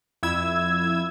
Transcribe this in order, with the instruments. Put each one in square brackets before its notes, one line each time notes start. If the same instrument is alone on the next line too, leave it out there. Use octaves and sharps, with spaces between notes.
[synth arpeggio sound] F2 E4 E6 G#6